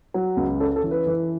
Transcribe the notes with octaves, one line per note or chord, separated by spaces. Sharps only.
F#3
C#2
C#4 A4
A4
E3
B4
E3